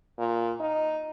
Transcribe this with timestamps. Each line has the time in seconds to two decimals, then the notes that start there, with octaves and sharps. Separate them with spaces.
0.19 A#2
0.60 D#4